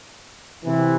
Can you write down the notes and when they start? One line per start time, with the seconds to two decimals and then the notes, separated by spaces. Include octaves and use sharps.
0.64 C3 E3